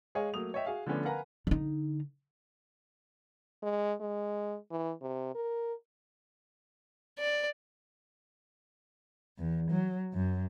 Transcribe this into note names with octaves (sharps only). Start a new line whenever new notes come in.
G#3 G#4 C#5 D#5 F5
F#3 A3 A#3 D#6 F7
C#5 D#5 E5 G5
F#4 G#4 F5
D3 F3 A3 B3 C#4 D4
A#4 B4 F5 F#5 G#5 A#5
D3 D#4
G#3
G#3
E3
C3
A#4
D5
E2
F#3
F#2